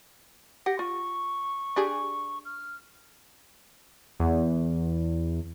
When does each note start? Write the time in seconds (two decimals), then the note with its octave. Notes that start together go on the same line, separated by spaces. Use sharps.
0.66 G4 F#5 A#6
0.79 F4 C#6
1.76 D4 G4 G#4
2.45 F6
4.20 E2